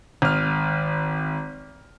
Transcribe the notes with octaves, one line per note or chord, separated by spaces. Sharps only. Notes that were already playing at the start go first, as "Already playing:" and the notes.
G#1 F6